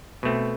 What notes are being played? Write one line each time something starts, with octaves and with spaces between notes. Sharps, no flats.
B2 A3 C4